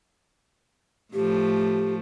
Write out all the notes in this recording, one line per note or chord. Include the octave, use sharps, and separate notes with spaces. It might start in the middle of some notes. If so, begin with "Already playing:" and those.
A2 F3 A3 G4